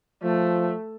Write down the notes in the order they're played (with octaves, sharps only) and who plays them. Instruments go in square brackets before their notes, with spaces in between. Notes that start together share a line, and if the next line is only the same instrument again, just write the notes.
[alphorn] F3 [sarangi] A3